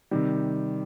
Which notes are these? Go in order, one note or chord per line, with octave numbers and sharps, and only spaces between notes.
C3 D#3 G3